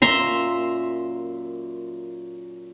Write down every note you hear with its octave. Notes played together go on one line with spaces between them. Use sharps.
F#2 A#2 E5 A#5 C6